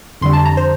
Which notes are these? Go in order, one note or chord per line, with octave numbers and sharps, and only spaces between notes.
F2 D3 G3 C6
A5
A#5
C5